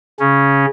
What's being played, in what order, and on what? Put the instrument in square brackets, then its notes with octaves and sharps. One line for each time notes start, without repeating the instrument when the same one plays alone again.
[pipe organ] C#3 C#4